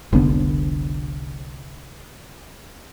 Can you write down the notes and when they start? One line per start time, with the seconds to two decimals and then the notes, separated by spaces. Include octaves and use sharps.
0.13 F1 C2 D3 B3